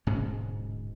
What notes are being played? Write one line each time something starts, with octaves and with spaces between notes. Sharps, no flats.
D1 G#2 B2 C#4